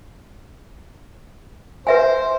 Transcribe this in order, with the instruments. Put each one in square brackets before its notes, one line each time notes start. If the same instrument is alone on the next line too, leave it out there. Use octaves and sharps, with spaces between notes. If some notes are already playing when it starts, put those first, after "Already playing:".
[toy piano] B4 E5 G#5 [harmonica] C5